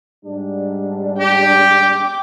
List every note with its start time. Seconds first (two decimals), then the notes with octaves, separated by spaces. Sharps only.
0.24 G#2 G3 D4
1.20 G4 G5 D6